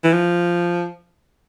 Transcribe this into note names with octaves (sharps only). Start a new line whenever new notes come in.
E3
F3